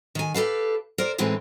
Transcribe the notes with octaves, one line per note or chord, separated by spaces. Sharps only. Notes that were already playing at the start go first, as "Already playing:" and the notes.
D#3 G#5
G4 A4 B4 F5
A#4 C5 D5
A2 D#3 E3 G#3 C4